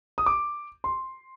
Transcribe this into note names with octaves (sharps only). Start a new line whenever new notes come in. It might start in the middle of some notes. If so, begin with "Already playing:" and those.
D#6
D6
C6